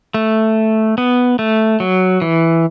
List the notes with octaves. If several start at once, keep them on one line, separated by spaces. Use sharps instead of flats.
A3
B3
A3
F#3
E3